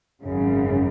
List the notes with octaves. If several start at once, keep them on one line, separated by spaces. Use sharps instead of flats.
G#1 F#2 C#3